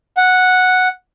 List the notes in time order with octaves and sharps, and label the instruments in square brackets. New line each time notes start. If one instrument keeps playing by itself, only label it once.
[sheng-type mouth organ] F#5